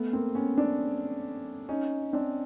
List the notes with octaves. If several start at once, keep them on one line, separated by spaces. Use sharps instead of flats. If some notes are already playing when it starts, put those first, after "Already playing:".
Already playing: A3 B3
A#3 C4
B3 C#4
C4 D4
C#4 D#4
C4 D4